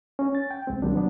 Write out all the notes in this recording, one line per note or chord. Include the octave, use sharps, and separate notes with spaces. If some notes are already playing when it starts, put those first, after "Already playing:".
C#4
A6
G5
C2 G#3 C4
B2 D#3 F#3 G3 A#3 D4
F#3 B3 D4